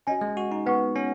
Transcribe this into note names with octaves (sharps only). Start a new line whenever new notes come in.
C#4 F#4 D#5 G#5
G#3
F#4
D#4
B3 B4 F#5 C#6
C#4